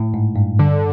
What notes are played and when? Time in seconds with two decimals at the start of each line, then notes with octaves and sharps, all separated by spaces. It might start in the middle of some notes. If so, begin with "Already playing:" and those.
Already playing: A2
0.14 G#2
0.36 G2
0.59 G2 D3